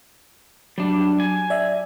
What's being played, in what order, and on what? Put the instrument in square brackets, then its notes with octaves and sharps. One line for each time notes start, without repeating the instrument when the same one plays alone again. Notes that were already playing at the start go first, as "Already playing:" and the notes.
[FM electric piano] F#3 [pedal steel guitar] G3 D4
[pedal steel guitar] G#5
[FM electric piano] D5 E5